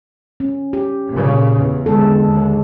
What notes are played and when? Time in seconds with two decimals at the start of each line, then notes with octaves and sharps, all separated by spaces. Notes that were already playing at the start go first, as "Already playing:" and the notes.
0.40 C#4
0.73 G4
1.10 A#2 C#3
1.58 E2
1.86 D3 G#3 A4
2.28 D#2